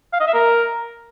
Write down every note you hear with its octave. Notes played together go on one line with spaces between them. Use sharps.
F5
D#5
E5
A#4